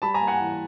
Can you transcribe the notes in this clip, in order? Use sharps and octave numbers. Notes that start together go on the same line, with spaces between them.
G3 A5 B5
G#5 A#5
A#3
F#5 G#5
E3